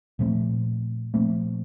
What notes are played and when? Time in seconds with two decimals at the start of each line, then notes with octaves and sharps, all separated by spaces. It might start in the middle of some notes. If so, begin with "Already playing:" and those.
0.19 A#2 F3 A3 C4
1.14 A#2 F3 A3 C4